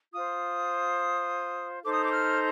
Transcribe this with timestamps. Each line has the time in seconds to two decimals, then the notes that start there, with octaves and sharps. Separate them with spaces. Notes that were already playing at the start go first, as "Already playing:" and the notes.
0.12 F4 C5 D#6
1.83 D#4 A4 C5 D6
1.92 D#6
2.02 D6
2.12 F6